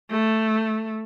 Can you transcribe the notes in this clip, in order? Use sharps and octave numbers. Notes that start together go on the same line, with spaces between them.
A3